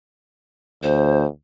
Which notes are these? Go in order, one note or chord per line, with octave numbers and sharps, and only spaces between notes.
D2 C5